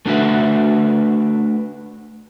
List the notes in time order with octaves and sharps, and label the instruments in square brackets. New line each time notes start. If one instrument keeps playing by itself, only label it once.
[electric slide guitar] A3 D4 F#4 B4 E5